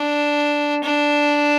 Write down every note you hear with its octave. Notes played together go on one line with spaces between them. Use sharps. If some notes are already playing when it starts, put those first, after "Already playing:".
Already playing: D4
D4